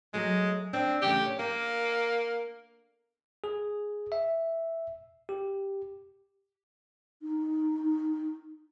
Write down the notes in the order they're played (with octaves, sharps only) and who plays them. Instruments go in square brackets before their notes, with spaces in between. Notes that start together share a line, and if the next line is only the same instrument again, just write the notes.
[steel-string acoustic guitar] F#3 A3 [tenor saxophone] G#3
[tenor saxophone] C4 [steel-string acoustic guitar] D4
[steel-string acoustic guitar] E2 C#3 A3 [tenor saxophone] G4
[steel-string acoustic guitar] C#5
[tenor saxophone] A#3 [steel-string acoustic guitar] A#4
[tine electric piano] G#4
E5
G4
[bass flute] D#4